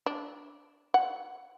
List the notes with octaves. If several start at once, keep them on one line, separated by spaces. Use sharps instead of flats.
D4
F#5